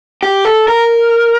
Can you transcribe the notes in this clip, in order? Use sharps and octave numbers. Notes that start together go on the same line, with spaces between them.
G4
A4
A#4